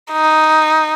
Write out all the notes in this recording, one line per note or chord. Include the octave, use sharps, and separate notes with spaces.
D#4